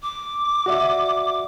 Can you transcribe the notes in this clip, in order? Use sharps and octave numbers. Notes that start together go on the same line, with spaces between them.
D6
F#4 D5 E5